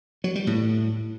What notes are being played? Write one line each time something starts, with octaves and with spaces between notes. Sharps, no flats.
F#3
G3
A2